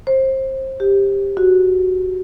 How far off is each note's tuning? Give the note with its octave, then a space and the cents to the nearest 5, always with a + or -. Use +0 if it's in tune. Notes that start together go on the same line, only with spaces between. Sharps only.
C5 +25
G4 +10
F#4 +0